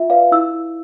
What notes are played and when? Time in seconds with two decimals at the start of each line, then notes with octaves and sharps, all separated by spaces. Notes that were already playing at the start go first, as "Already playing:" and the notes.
Already playing: F4 E5
0.10 B4 D5 F5
0.32 E4 E6